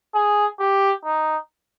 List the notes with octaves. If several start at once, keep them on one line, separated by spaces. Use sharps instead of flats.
G#4
G4
D#4